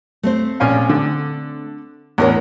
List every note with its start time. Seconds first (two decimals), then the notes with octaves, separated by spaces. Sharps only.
0.23 A3 C4 C5
0.60 A#1 C#4 F5
0.89 D3
2.18 E2 A2 D4 A#4 C#5